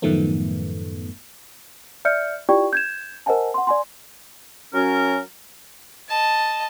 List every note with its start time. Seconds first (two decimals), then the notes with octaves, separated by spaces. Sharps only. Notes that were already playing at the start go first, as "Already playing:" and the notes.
0.02 F#2 A2 D#3 F3 A3 B3
2.05 D5 E5 F6 G6 C#7
2.49 E4 F4 G4 D5 G5 C#6
2.73 G6 G#6 E7
3.26 A#4 C5 D#5 F#5 G#5 A5
3.54 F#5 C6
3.67 D5 G#5 C6
4.74 F#3 C#4 A#4
6.08 D#5 A5